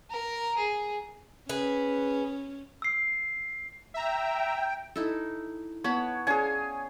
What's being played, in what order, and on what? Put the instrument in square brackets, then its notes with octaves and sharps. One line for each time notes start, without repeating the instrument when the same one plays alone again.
[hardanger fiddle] A#4
G#4
[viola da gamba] C#4 [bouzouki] G#4 B4
[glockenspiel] E6 C7
[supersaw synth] E5 A#5 [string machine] G5
[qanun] D#4 E4 A4
[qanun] B3 A5 B5 [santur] C#5
[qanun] C#4 D4 C#5 [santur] G#4 G#5